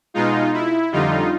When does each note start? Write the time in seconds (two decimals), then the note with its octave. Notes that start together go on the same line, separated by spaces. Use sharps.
0.14 B2 G#3 D#4 F4
0.53 E4
0.92 F2 D3 G3 D#4 F4